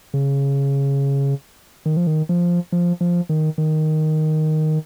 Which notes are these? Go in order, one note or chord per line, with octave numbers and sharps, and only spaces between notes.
C#3
D#3
F3
D#3
F3
F3
F3
D#3
D#3